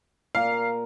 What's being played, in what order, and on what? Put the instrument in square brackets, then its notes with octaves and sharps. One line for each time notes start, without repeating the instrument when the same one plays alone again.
[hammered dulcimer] A#2 A#5 [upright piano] F5